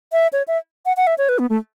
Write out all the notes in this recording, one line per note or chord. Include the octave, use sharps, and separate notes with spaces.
E5
C#5
E5
F#5
F#5
E5
C#5
B4
B3
A3